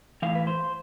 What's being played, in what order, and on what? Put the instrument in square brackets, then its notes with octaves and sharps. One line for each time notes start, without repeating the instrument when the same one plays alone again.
[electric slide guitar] A2 E3 F5
B4
C5